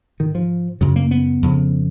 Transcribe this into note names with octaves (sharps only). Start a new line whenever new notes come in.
G#2 D#3
F3
F#2 C#3 F#3
A#3
B3
F2 C#3